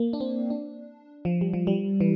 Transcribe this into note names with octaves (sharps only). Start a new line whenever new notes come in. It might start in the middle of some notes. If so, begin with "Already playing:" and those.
Already playing: A#3
D4
C4
D4
F3
G3
F3
G3
E3